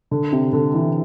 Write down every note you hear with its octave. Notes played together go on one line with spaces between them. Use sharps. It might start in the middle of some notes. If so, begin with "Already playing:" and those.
D3
C3
D3
E3